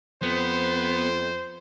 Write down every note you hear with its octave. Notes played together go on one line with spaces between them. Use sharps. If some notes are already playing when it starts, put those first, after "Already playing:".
F2 B3 C5